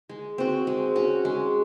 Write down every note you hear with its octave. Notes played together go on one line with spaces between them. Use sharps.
G#3
C4 F#4
G#3
C#4 F#4
G#3